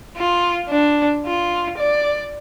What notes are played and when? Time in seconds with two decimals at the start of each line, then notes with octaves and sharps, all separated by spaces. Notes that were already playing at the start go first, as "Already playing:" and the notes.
0.17 F4
0.69 D4
1.26 F4
1.78 D5